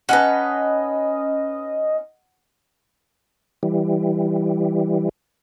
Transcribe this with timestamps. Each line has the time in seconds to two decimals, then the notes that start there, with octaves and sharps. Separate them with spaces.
0.09 C#4 D#4 B4 D#5 F#5 A5
3.63 E3 G3